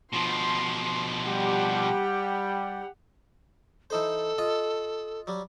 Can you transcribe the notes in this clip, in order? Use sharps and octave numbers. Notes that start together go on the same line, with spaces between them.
B2 F3 C6
G3 G4 F#5
E3 D#4 A4 C5
F4 D#5
F#3 G3